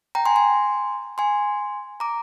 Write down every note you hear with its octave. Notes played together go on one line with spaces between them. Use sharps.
G5 A#5
G#5 C6
G#5 C6
G#5 C6
A#5 D6